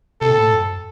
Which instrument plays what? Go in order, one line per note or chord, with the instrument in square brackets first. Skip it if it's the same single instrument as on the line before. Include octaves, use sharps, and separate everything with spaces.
[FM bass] C3 [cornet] A4
[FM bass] A#2
A2
F#2